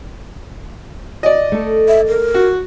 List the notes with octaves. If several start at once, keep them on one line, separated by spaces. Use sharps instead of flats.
D5 D#5
A3 A4
E5
A#4
F#4